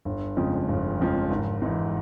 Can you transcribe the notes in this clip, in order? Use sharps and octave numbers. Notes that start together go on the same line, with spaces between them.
G1
F2 C#3 F3 G#3
G1
F2 C#3 F3 G#3
G#1
G#2 E3